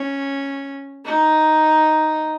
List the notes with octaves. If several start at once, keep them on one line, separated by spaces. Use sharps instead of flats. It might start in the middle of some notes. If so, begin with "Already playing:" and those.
Already playing: C#4
D#4